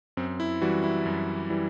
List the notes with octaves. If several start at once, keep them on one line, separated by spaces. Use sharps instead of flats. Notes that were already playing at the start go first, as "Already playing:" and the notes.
F#2 C4
E4
E3 G3 F#4
E4
F#2
E3 G3